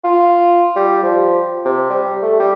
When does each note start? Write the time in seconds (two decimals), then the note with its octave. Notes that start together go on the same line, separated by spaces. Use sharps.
0.04 F4
0.76 G3
1.03 F3
1.65 C3
1.90 G3
2.22 A3
2.39 G3